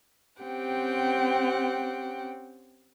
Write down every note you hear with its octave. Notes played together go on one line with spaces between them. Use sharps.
C4 C#4 G4 F#5 G5